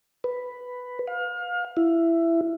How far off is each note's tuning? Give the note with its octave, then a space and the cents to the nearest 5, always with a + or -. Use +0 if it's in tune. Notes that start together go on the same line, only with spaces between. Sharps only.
B4 +5
F5 +30
E4 +15